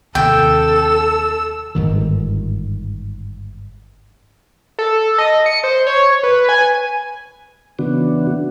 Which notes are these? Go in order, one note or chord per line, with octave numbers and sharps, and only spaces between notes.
D#2 C3 A4 G5 E6
G1 G#2 D#3
A4
D#5
C#7
C5
C#5
B4
G#5
C#3 E3 B3 D4 F#4